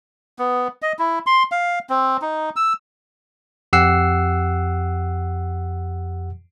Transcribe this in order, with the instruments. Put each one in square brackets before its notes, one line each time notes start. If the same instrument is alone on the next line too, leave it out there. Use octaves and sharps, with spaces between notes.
[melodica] B3
D#5
E4
C6
F5
C4
D#4
E6
[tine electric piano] F2 G4 F#5 E6 C7